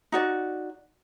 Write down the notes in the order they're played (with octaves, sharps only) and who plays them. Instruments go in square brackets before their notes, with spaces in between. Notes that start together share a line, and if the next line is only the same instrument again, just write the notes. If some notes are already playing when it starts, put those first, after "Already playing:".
[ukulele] D#4 F#4 D5